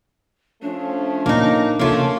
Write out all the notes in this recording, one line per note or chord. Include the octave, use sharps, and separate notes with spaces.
F3 A3 C#4 D4
A#2 A#3 D#4
C3 A3 A#3 C#4 D#4 F4